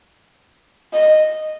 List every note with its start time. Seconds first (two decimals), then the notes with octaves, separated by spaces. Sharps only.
0.93 D#5